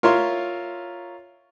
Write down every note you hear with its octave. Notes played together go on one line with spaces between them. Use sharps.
F4 A#4 C#5 E5 C6